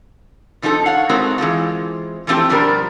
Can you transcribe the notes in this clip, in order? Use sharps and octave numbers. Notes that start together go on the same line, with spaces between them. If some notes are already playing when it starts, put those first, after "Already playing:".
C3 F3 D#4 F#4 A4
C#5 F5 F#5
G#3 A3 C4 D#4 F#4 A#4
E3 G#3 C4 F4
E3 F3 A3 C4 G4 A4
B2 F3 G3 D4 G4 A#4